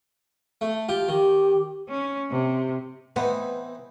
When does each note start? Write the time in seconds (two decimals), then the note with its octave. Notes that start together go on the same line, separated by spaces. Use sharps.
0.61 A3
0.89 F4 G4
1.08 D#3 G4
1.89 C#4
2.31 C3
3.16 E3 B3 C4 D#4